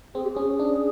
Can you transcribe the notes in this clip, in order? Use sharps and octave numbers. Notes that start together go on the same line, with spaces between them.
C4 G#4
G4
G#4
C#4
D4